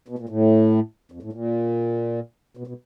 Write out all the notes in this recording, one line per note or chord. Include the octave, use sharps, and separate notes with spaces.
B2
A#2
A2
F2
A2
A#2
B2
B2